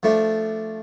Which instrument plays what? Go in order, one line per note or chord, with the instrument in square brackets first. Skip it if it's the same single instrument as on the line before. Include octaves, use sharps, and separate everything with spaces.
[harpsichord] F3 A3 D4